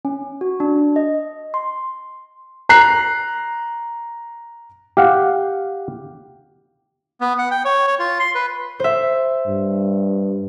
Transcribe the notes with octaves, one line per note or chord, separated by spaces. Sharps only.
C#4
F#4
D4
D#5
C6
A#5 F#6 C7
G4 F5 F#5
B3
F#5
G5
C#5
C#5
F4
C6
B4
C5 E5
G2